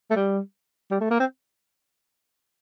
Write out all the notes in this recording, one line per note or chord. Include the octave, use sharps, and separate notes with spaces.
A3
G3
G3
A3
A#3
C4